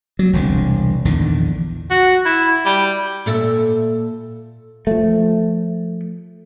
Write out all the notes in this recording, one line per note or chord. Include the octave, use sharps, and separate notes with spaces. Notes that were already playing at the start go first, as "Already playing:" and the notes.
F#3
E1 C2 D3
A#1 E2 D3 D#3
F#4
E4
G3
A#2 A4 E5
F3 A3